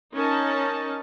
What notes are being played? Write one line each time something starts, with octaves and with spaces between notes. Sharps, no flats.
C#4 D#4 A#4 A5